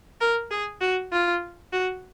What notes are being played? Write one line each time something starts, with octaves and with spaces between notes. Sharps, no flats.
A#4
G#4
F#4
F4
F#4